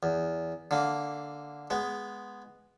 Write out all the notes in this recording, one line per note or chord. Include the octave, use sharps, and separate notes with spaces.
E2
D3 A#3
G#3 B3